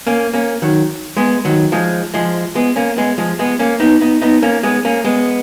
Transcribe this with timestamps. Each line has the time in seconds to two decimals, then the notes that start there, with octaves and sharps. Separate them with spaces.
0.07 A#3 C#4
0.33 A#3 C#4
0.62 D#3 F#3
1.17 G#3 B3
1.45 D#3 F#3
1.72 F3 G#3
2.14 F3 G#3
2.55 G#3 B3
2.76 A#3 C#4
2.97 G#3 B3
3.18 F3 G#3
3.39 G#3 B3
3.59 A#3 C#4
3.80 B3 D#4
4.01 B3 D#4
4.22 B3 D#4
4.43 A#3 C#4
4.63 G#3 B3
4.85 A#3 C#4
5.04 G#3 B3